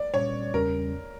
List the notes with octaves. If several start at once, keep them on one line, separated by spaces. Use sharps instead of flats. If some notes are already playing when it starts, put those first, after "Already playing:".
Already playing: D5
A#2 G3 C#4 C#5
E2 C#3 G3 C#4 A#4